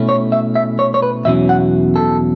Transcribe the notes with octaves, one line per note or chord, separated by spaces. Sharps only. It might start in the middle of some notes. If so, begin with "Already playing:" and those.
Already playing: B2 A3 C#4 E4
C#5
E5
E5
C#5
C#5
B4
E2 B2 F#3 C#4 E4 E5
F#5
A4